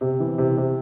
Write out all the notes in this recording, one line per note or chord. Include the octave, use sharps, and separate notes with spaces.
C3
E3
C3
C3